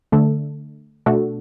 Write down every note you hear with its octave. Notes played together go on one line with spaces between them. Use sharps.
D3 A3 D4 A4
B2 A3 D4 F#4 A4